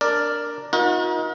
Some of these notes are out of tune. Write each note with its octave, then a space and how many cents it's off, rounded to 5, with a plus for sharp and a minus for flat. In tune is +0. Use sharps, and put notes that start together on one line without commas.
D4 +0 A#4 +0 D5 +0
D#4 +30 F#4 -45 A#4 +40